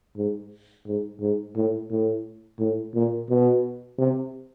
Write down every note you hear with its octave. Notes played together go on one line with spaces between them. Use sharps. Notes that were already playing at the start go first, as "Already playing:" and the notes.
G#2
G#2
G#2
A2
A2
A2
A#2
B2
C3